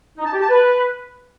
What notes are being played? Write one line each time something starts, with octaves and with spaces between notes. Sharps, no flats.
D#4
A5
G4
A5
B4